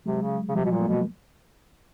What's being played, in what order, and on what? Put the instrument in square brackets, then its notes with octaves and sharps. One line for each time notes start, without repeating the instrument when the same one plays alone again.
[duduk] C3 [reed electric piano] F#3 G#3
[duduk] C#3
C#3
[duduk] C3 [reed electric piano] F3 G3
[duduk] B2 [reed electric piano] F#3
[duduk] A#2
[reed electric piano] A3 B3
[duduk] B2 [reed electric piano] A#3